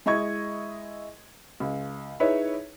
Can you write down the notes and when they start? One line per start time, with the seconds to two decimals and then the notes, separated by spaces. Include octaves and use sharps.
0.06 G#3 E4 D#5 C#6 G#6
1.60 C#2
2.20 D#4 E4 G#4 B4 C#5 E5